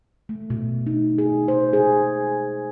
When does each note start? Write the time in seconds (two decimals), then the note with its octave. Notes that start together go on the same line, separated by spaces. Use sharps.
0.29 A3
0.50 B2
0.87 D#4
1.18 G#4
1.48 C5
1.73 G#4